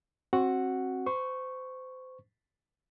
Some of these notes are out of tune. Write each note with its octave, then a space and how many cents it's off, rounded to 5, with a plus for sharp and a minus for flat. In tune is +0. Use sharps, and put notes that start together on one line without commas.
C4 +25 F#4 +0 F#5 +0
C5 -30 C#6 -5